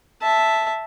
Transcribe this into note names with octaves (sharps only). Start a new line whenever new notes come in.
E5 A5